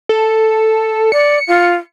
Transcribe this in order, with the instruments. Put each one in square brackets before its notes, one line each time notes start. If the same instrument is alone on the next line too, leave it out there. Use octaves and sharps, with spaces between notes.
[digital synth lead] A4
[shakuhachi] D5 [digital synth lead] C#7
[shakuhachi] F4